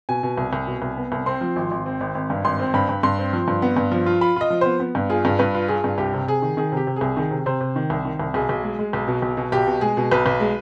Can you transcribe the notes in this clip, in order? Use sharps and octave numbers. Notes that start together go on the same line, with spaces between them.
B2 G#5
B2
C2
C2
B2
C2
B3
C2
C4 C6
F3
G#1
G#1
C4
G#1
G#1
G2
G#1 C6
C4
G2 B5
G2
G2 C6
C4
F3
G2
B3
G2
F3
F4
F4 B5
F4 D#5
F3
B3 C5
B3
G2
F4 G#4
G2
G2 B4
F4
F4 G#4
G2
C2 G4
C3
C3 G#4
D#3
D#3 G#4
C3 G4
C3
C2 G#4
D#3 G#4
C3
C3 C5
C3
D#3
C2
D#3
C2
B1 G#4
B1
G#3
G#3
B1
B2
B1
B2
B1 G4
B2
G#3 G#4
B2
B1 B4
B1
G#3